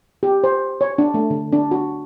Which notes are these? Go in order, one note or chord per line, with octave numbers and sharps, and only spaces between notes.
G4
C5
C#5
D4
A3
D3
D4
F#4